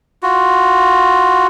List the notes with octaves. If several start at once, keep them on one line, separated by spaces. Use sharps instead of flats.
F4 F#4